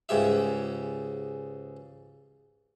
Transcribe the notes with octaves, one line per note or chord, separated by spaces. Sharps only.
C#2 G#2 G4 E5